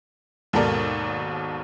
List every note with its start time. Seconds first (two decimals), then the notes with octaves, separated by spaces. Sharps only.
0.53 D#2 G#2 B2 A4 A#4 D5